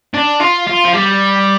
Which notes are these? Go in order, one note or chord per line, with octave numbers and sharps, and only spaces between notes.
D4
F4
F4
F3
G3